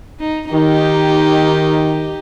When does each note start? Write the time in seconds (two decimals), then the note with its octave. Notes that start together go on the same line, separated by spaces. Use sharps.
0.20 D#4
0.53 D#3 D#4 G4